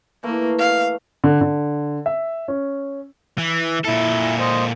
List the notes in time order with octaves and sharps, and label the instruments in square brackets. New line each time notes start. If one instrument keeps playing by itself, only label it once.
[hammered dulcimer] E3 A3 [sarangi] A#3
[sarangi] F5
[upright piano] D3
D3
E5
C#4
[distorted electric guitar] E3
[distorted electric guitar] A#2 A4 [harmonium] E4
[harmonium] C5 D#5